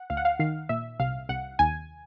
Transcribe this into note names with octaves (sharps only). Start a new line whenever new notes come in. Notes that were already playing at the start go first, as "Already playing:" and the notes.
Already playing: F#5
D2 F5
F#5
F5
D#3 F5
A#2 E5
C2 F5
C2 F#5
D#2 G#5